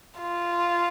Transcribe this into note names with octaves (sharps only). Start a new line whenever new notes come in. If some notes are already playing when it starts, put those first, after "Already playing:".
F4